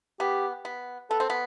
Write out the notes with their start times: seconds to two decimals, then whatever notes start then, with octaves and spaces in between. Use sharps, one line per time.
0.20 B3 G4
0.65 B3
1.10 B3 A4
1.20 C4
1.30 B3